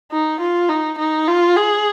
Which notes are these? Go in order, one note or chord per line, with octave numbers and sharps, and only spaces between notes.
D#4
F4
D#4
D#4
F4
G#4